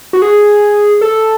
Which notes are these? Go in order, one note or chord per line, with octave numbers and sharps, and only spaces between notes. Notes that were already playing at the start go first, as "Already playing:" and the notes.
F#4
G#4
A4